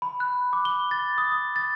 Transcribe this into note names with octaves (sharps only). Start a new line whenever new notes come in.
B5
F#6
D6
G7
A6
D#6
D#6
A6